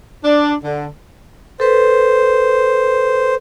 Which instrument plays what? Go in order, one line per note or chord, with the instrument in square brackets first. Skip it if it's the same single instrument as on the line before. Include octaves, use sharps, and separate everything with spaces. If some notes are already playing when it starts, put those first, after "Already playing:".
[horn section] D4
D3
[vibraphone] A4 B4 [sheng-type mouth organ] C5